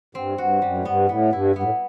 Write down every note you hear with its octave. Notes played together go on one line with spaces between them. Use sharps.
G2 C4
G2 F#4
F#2 G3
A2
G2 B3
A2 B3
G2 E4
G2 B3
A2